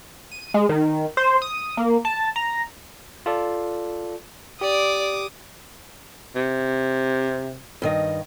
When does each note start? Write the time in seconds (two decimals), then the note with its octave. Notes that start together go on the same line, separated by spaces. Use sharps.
0.31 D#7
0.54 G#3
0.69 D#3
1.17 C5
1.42 D#6
1.77 A#3
2.05 A5
2.36 A#5
3.26 F4 A4 D5
4.61 G4 D5 D6 D#6
6.36 C3
7.82 G2 D#3 D#5